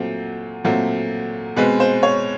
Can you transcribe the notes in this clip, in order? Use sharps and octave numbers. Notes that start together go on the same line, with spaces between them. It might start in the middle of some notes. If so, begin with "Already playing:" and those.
Already playing: A#2 F#3 A3 C4 C5
A#2 F#3 A3 C4
B2 G#3 C4 B4
C5
C#5